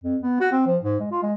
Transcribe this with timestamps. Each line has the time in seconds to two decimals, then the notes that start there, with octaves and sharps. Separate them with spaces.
0.04 F2
0.23 B3
0.41 F#4
0.52 C4
0.66 F3
0.83 G#2
1.00 G#3
1.12 F4
1.23 G#3